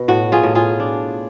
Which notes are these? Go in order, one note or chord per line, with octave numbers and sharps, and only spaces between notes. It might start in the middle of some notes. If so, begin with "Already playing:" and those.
Already playing: B2
A2 F#4
F4 G#4
A2
F4 G#4
D4